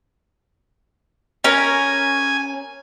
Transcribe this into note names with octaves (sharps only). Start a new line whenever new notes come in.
C#4 A#4 G#5